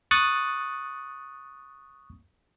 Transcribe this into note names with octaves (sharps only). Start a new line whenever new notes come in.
C#6 D#6 F#6 A6